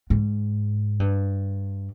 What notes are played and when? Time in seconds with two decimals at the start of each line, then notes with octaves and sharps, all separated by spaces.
0.10 G#2
1.00 G2